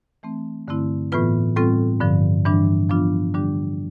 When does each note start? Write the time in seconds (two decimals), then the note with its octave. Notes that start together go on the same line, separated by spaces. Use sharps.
0.23 E3 A3 C4
0.68 G2 D3 A3 C4 E4
1.12 A2 E3 B3 F4 B4
1.56 A2 G3 C4 F4 A4
2.01 G2 D3 F3
2.45 G2 E3 G3 D4
2.89 F3 B3 D4 F4
3.34 D3 G3 D4 G4